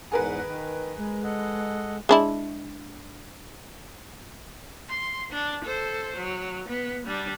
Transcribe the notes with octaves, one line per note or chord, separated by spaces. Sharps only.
E2 G#2 G#4 A#4 B4 F#5
D#3
G#3
A4 D#5 F#5
G#3 D4 E4
C6
D4
A4 C5
F#3
B3
G3 D4